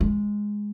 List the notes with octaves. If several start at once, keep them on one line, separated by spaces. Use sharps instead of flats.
G#3